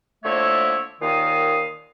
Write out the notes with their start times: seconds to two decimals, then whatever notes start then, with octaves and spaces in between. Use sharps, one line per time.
0.23 D3 F3 A3 A#3 E4 C#5
1.01 D#2 A#2 D#3 F5 D#6